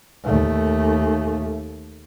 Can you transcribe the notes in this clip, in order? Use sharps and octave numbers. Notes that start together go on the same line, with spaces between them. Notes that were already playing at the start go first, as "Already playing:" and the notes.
D#2 A3